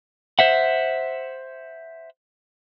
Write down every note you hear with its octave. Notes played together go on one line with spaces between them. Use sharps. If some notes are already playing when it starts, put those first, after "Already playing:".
C5 E5 F#5